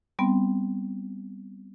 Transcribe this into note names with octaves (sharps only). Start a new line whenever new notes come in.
G3 B3 C4